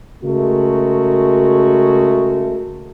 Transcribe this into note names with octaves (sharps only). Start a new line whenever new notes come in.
C#3 G#3 A3 F#4 A#4